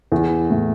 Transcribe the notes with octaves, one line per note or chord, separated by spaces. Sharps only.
E2
A2